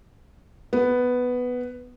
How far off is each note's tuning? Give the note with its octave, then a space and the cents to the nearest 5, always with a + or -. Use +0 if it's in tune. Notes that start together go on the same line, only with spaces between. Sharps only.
B3 +5